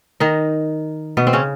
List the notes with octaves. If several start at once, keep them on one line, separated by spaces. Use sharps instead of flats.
D#3 D#4
B2 B3
C4
C#3 C#4